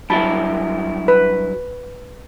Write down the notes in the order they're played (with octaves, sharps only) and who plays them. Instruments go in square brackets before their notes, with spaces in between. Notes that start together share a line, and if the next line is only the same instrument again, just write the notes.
[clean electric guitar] G2 F#3 E4 [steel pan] A5 B5
[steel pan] B4